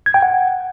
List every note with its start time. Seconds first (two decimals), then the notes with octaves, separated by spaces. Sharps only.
0.06 G#6
0.14 G5
0.22 F#5